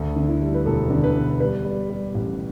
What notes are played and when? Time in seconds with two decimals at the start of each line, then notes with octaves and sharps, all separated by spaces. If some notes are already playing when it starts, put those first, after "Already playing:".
Already playing: D2 A4
0.16 D3
0.28 E4
0.41 G3
0.54 B4
0.65 E1 A4
0.90 D3
1.04 B4
1.15 E1
1.40 G3 B4
1.65 G3
1.90 G3
2.14 A1